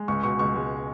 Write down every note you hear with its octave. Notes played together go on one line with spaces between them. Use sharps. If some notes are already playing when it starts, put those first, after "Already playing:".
Already playing: G#3
C#2 C#6
B2 C#6
C#2 C#6
G#3